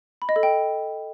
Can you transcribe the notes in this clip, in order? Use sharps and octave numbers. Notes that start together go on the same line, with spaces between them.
B5
D#5
A4
G5